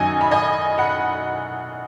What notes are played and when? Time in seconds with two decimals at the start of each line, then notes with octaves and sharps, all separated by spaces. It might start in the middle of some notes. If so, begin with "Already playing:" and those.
Already playing: F#2 D#3 F#3 D#5 G#5
0.21 B5
0.31 D#5 G#5
0.78 F#5 B5